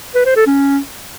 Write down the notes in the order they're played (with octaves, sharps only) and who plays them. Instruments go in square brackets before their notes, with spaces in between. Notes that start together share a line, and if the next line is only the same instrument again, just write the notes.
[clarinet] B4
C5
A4
C#4